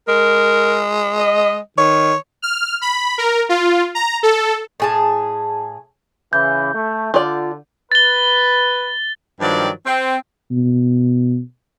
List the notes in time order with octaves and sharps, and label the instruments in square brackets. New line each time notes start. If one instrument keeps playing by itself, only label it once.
[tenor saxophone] G#3 [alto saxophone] A#4
[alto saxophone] D#5
[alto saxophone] D#3 [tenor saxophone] C#5
[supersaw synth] F6
B5
A#4
F4
A#5
A4
[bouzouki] A2 G#4 A5
[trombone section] C#3 E3 [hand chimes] G6
[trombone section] A3
[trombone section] D3 [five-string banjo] F4 D5
[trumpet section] B4 [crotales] A6 G7
[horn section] G2 D#3 F3 F#3 D5
C4
[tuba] B2